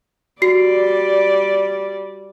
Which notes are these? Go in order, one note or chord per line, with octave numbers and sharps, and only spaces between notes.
G3 F#4 D5 C7